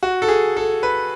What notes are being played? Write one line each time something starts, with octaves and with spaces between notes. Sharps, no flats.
F#4
A4
G#4
A4
B4